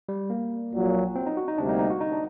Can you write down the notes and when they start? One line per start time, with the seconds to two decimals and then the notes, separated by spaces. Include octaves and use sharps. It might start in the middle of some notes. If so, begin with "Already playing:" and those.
0.09 G3
0.30 A#3
0.73 A#1 A#2 F#3
1.16 C4
1.26 D#4
1.37 F#4
1.48 D#4
1.58 D2 C3 G3 A#3 D4
1.69 D#4
1.79 D#4
1.90 F#4
2.01 D#4
2.12 D4